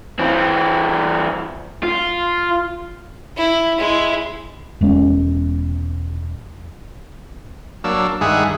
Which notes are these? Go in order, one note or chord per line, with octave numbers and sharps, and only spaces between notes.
E3 C4
F4
E4
G#3 E4
E1 G#3 C#4
F#3 A#3 D4 E6
G2 D#3 G#3 G#4 E5 F#5